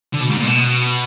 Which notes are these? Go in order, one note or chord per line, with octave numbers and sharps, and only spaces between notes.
D3
B2
G#2
A#2
B2